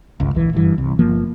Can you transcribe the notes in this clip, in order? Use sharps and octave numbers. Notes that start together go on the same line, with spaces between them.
G1 C#2
D1 A#1 E3
F#1 G2 E3
C2
G1 F3 A#3